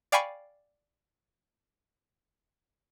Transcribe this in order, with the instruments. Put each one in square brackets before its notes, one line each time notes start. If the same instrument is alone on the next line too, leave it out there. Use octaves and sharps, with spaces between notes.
[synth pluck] D5 F5 G5 G#5 B5 C#6